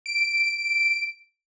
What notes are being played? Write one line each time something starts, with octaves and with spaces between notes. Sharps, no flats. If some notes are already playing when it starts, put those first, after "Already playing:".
D7